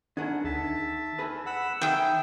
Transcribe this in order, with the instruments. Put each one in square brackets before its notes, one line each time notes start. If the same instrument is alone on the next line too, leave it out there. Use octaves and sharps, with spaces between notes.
[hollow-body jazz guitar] D#3 G#4 [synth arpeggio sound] D4 [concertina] F#5
[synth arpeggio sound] D2 [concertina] E5 A5
[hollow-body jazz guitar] G#4 B4
[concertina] F#5 B5 E6
[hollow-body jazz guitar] D#3 [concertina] G#4 [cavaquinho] E5 G5